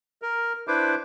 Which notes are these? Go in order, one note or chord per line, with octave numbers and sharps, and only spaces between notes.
A#4
D4 E4 B4 C5 D6